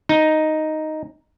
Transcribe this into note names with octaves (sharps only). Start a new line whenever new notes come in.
D#4